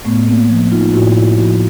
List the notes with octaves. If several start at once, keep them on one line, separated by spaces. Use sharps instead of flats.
A2 A3 B3
A#3 C4
F3
D#4 F4
A2 E4 F#4
E4 F#4
F3 E4 F#4